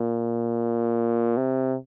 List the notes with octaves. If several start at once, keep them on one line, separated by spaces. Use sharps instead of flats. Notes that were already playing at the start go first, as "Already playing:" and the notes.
Already playing: A#2
C3